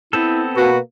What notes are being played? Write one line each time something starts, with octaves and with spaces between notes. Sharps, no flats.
B3 C4 E4 A4
B2 A#3 F#4 B4